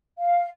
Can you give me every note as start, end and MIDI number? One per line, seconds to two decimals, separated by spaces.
0.18 0.48 77